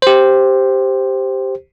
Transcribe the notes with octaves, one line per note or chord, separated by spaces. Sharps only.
G4 C5